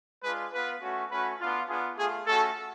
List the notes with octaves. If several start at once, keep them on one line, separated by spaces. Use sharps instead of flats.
G#3 D4 F4 B4
B3 F4 B4
A3 C#4 F#4
A3 C#4 F#4 B4
B3 D4 F4
B3 D4 F4 G#4
A3 F4 G#4
A3 C#4 F#4 A4